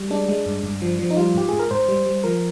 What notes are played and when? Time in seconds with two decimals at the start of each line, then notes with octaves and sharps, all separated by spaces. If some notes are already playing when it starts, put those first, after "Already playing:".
Already playing: G3
0.10 G#3 D4
0.29 G#3
0.46 G2
0.63 G2
0.82 F3
0.99 F3
1.11 D#4
1.17 G3 F4
1.34 G#2 G4
1.49 G#2 G#4
1.59 A#4
1.71 G#2 C5
1.88 G3
2.06 G3
2.24 F3 A#4